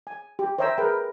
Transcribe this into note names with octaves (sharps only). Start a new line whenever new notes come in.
G#5
G4
C5 C#5 E5 G5 A#5 E6
G#4 A#4 B4 G5